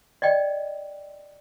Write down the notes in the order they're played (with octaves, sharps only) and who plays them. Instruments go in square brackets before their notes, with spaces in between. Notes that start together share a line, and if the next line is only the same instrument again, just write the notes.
[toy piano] D5 D#5 G5